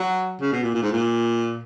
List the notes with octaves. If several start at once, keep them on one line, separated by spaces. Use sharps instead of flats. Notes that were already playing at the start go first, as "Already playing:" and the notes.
Already playing: F#3
C#3
B2
A#2
A#2
G#2
A#2